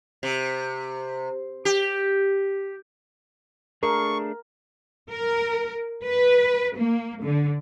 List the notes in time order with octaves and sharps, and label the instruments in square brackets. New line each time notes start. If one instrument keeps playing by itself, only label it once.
[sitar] C3
G4
[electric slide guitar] A3 D4 G#4 [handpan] A#4 [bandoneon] C#6
[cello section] A#4
B4
A#3
D3